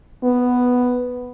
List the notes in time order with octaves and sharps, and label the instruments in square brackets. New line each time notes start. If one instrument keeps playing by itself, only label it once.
[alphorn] B3